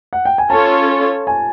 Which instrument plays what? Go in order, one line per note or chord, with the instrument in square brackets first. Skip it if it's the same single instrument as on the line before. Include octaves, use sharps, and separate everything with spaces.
[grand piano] F#5
G5
G#5
[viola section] C#4 F4 A4 C#5 [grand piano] A5
[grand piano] G#5